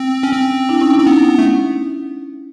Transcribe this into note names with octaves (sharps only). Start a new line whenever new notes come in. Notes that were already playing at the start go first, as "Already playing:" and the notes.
Already playing: C4
C#4
C4
D4 E4
C#4 D#4
D4 E4
C4
B3 C#4 D#4
A3